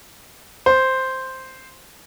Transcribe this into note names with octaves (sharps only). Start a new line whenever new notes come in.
C5